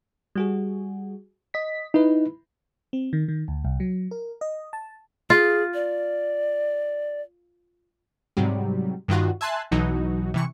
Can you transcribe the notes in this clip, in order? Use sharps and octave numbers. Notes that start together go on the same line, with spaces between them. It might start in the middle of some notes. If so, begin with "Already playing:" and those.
G3 F#4 G#4
D#5 B6
D#4 E4 B4
C4
D#3
D#3
D2
C2
F#3
A#4
D#5
A5
F4 G#4
D5
G#2 C3 F#3 G3
G2 D#3 F4 F#4
E5 G#5 A5 C6 F#6
B1 B2 E3 F#3 D#4 F#4
C3 E3 C#6